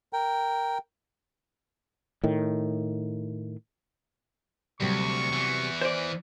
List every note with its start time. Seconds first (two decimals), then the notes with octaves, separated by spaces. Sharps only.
0.13 A#4 G5
2.24 A2 D#3
4.80 D2 C3 F#3 G3 C#6
5.33 E2 E3
5.81 C5 D5